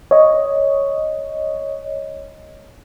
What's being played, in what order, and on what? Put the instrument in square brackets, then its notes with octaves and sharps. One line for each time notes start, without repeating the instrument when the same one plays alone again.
[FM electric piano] C#5 D#5